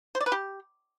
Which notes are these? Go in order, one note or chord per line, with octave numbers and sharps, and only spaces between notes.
C5
D5
B4
G4